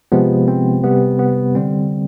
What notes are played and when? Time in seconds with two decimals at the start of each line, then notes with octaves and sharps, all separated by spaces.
0.12 C3 F3 G#3 B3
0.48 C4
0.84 C3 G3 B3
1.19 B3
1.55 D3 G3 C4